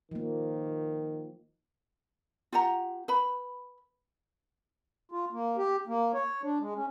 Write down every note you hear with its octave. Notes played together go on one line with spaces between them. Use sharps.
D#3 F3 A#3
F4 G4 F#5 A#5
B4 B5
F4
A#3
G4
A#3
C#5
D4
G#3
C#4